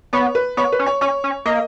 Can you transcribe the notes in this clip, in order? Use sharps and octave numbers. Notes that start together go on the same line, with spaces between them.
B3 C#5
B4
B3 C#5
B4
C#4
C#5
C#4 C#5
C#4
A#3 D#5